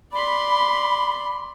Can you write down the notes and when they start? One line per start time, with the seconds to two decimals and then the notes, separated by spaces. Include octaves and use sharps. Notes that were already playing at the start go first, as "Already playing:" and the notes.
0.12 D5 B5 C6